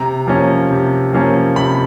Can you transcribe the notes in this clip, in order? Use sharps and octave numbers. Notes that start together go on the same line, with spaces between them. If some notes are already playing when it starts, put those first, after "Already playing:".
Already playing: C3 A#5
F3 A#3 C#4
C3
F3 A#3 C#4
C3 B5